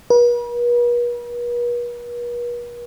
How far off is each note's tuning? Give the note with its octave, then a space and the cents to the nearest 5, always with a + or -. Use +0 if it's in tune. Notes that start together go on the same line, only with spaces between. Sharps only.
B4 -45